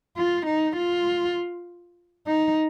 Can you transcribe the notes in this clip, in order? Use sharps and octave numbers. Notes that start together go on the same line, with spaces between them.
F4
D#4
F4
D#4